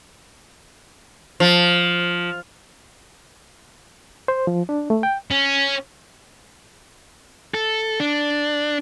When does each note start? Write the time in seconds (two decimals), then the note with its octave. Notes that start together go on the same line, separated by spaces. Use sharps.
1.40 F3
4.28 C5
4.47 F3
4.69 D4
4.90 A3
5.03 G5
5.31 C#4
7.54 A4
8.00 D4